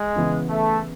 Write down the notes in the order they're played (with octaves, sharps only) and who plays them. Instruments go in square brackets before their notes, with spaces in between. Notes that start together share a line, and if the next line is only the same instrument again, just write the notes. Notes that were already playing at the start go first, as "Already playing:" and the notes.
Already playing: [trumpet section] G#3
[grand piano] C#3 E3 B3
[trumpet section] A3